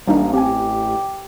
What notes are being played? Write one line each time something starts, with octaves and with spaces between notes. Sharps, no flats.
A1 G3 A#3 D4 D#4
C4 G4 G#5